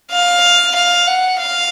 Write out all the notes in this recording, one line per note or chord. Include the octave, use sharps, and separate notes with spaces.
F5
F5
F#5
F5